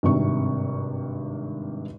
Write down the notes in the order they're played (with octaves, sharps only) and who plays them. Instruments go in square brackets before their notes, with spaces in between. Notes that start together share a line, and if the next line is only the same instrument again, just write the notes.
[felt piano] G#1 G2 C3 D#4 C#6